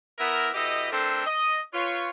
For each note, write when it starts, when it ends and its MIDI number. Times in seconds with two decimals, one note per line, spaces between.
0.19 0.49 59
0.19 0.49 64
0.19 0.49 70
0.54 0.87 47
0.54 0.87 64
0.54 0.87 67
0.54 0.87 69
0.54 0.87 75
0.91 1.21 57
0.91 1.21 60
0.91 1.21 62
0.91 1.21 69
0.91 1.21 70
0.91 1.21 72
1.26 1.59 75
1.73 2.09 65
1.73 2.09 71
1.73 2.09 73